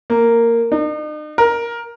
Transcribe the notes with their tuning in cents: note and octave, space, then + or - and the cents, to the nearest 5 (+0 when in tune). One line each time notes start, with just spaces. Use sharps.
A#3 -10
D#4 -45
A#4 +10